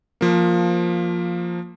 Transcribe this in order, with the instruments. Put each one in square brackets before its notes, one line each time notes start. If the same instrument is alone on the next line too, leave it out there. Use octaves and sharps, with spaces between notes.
[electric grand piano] F3 A#3